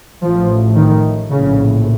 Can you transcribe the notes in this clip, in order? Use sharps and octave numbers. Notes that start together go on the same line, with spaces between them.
A1 A2 F3
D#3
A#1 A2 C#3